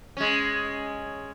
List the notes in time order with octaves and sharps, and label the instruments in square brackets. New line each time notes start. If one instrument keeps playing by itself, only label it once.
[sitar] G#3 C#4